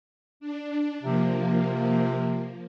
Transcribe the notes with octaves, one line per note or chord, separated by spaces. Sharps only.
D4
C3 F3 A#3